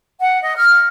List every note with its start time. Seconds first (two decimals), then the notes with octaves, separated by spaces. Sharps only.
0.20 F#5
0.42 D#5
0.57 F6